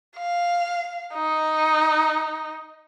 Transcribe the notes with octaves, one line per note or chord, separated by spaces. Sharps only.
F5
D#4